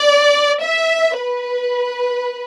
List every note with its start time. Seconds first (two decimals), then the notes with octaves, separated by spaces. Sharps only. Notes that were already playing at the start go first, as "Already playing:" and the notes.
Already playing: D5
0.63 E5
1.20 B4